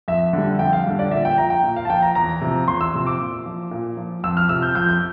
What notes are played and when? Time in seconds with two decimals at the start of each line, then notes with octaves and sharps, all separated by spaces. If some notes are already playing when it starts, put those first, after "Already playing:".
0.08 F2 E5
0.33 D3 G3
0.59 F2 G5
0.73 F5
0.86 D3 G3
0.99 D5
1.11 A#2 E5
1.25 G5
1.38 F3 A#5
1.50 G5
1.64 A#2
1.76 F5
1.85 A5
1.90 F3 G5
2.02 A#5
2.15 E2 A#5
2.41 C3 F3
2.68 E2 C6
2.81 E6
2.93 C3 F3 E6
3.06 D6
3.19 A#2
3.46 F3
3.71 A#2
3.97 F3
4.24 F2 E6
4.37 F6
4.49 C3 F3 E6
4.62 G6
4.75 F2 G6
4.89 G6